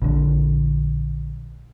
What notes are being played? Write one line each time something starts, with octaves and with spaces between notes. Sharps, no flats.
A#1 D3